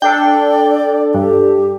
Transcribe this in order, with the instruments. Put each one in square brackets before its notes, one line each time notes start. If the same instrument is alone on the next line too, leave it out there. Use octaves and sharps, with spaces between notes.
[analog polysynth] D4 A4 [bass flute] D5 [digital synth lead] G5
[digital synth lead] G2 [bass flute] G4